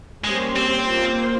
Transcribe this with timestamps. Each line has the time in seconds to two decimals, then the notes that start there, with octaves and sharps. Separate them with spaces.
0.24 G3 G#3 A#3 C#4 G4 C5
0.56 C4
0.87 A#3 F4 C5